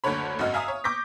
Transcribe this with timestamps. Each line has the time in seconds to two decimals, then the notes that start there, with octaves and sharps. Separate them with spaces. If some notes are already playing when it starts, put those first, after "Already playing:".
0.04 F#1 D2 D3 A4 C#5 B5
0.39 G#1 F#2 F#4 D#5 F6
0.54 E5 F5 G#5 A#5 D#6
0.68 C#5
0.84 C#6 D6 G6 A#6 B6